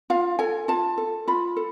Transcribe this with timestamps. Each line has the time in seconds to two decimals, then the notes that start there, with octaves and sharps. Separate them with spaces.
0.10 F4 F5
0.39 A4 G#5
0.68 F4 A5
0.98 A4
1.27 F4 B5
1.56 A4